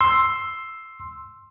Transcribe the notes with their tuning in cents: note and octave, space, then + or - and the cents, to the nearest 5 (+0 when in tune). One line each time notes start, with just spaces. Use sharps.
C6 +10 E6 +0